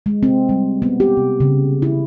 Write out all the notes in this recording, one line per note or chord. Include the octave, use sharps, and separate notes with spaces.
G#3
C4
G3
B3
G4
C3
C#3
E4